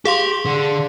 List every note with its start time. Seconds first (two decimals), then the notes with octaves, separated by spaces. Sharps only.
0.05 G4 G#4 F5 C6
0.46 D3